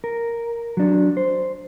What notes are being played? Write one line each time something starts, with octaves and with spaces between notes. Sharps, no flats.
A#4
F#3 D4
C5